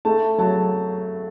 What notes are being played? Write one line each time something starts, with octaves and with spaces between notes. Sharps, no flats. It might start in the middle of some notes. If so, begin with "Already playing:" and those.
A3 A5
F#3 A5